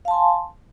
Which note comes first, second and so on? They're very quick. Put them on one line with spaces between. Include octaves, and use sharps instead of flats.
F5 A5 C6 G#5